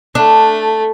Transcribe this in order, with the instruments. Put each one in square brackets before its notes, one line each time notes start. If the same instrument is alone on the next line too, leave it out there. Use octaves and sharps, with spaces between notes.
[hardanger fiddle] A3 [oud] D4